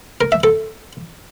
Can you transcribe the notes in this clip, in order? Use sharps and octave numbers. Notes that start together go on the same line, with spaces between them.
A#4
E5
A4